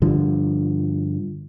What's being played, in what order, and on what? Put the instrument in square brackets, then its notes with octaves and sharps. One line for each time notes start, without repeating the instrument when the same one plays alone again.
[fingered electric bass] G2 D3 F3